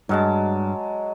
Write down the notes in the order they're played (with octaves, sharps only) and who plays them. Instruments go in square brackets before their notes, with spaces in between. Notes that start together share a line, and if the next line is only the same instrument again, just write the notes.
[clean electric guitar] G2 [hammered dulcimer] F#3 G#3 A5